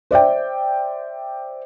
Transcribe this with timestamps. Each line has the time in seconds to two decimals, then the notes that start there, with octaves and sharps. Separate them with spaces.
0.11 C5 D5 E5 G5